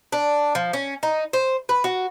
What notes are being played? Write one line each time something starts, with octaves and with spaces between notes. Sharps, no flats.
D4
F3
C#4
D#4
C5
B4
F#4